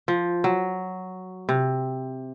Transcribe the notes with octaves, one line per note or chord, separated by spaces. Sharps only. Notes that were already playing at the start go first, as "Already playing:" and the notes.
F3
F#3
C3